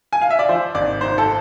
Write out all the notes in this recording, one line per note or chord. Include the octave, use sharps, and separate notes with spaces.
G#5
F5
E5
D5
F3 C5
G#1 D5
G#2 C5
A4